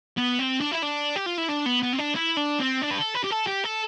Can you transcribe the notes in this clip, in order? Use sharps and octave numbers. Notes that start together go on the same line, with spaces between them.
B3
C4
D4
E4
D4
G4
F4
E4
D4
B3
B3
C4
D4
E4
D4
C4
D4
B4
A4
B4
G4
A4
G4
A4